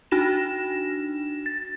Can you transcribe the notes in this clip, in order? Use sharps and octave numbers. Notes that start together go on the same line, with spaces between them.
D4 D#4 F#4 A#6 E7
A6